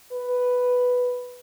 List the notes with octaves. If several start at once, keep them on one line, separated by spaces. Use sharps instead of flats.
B4